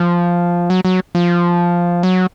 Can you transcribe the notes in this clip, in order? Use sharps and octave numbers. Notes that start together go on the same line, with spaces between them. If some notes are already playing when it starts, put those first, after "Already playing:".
Already playing: F3
F#3
F#3
F3
F#3